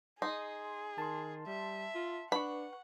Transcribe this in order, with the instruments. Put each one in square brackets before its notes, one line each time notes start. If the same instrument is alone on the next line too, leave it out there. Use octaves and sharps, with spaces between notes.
[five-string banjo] D#4 [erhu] G#4 [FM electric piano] C6
[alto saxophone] D#3 [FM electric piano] A5 C6
[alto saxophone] G3 [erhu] E5
[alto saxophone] F4
[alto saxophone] D4 [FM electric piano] B4 C#6 [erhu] F#5 [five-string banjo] B5